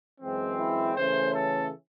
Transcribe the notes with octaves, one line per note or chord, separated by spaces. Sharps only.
F#2 E3 G#3 C4
E4
C#3 E3 A3 C#4 C5
A4